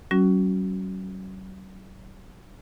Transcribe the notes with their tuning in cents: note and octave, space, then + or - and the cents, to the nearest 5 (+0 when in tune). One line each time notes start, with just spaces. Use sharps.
F#3 +40 C#4 +0 F#4 +0